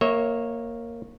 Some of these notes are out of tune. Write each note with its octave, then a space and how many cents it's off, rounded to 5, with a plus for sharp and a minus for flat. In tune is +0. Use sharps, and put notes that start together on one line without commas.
A#3 +0 C#5 -15 E5 -30